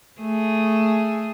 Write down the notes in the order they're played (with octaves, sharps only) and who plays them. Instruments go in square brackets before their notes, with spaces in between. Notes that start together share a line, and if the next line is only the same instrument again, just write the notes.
[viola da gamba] A3 G#4